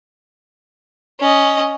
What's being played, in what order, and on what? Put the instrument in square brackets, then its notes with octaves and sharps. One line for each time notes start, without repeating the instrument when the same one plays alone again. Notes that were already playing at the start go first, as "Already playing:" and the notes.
[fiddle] C#4 D#5